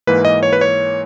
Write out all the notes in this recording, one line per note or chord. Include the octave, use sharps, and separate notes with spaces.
G#2 E3 A#3 B4
D#5
C#5
B4
C#5